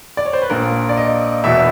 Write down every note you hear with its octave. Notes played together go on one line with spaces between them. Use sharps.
D5
C#5
C5
B4
A#1 A#2 A#4
D5
D#5
E1 E2 B2 E5